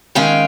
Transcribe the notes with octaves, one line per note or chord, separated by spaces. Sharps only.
D#3 G#3 C#4 F5 G5